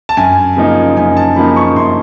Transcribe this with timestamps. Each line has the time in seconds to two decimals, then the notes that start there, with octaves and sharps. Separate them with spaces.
0.09 A5
0.17 F#2 G#5
0.57 C#3 F3 A#3 D#4
0.97 F#2 G#5
1.17 A5
1.36 C#3 F3 A#3 D#4 B5
1.56 C#6
1.76 F#2 C6